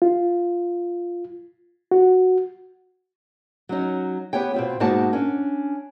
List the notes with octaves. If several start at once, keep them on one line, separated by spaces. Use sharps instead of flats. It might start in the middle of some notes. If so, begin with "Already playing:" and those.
F4
F#4
F#3 C#4 D#4
B3 G4 C#5 G5
B2 C4 F4
G#2 B2 A#3 D#4 F#4 A5
C#4 D4